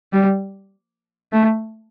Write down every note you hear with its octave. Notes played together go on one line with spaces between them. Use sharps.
G3
A3